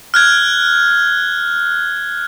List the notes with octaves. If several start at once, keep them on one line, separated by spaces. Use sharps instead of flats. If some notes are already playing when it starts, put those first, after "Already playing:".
F6 F#6 G#6